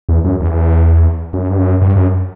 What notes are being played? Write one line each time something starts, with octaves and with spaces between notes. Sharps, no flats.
E2
F#2
E2
F#2
G2
F#2
G2
F#2